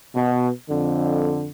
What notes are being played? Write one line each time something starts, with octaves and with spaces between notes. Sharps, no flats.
B2
F2 D3